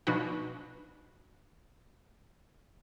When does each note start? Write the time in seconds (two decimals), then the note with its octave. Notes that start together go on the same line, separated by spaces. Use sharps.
0.07 B2 F3 B3 D4 D#4 F#4